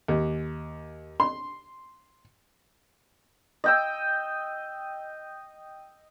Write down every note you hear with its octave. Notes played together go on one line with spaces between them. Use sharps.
D#2
C6
D#5 G5 E6